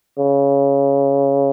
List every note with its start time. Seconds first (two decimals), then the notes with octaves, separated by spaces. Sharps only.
0.18 C#3